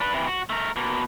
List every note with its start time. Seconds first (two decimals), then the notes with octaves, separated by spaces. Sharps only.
0.01 D4 B4
0.13 C3 E3
0.27 F#4
0.50 A3 A#4
0.76 B2 A#3